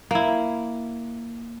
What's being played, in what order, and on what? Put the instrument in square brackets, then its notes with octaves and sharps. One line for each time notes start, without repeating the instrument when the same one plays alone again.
[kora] A#3 E4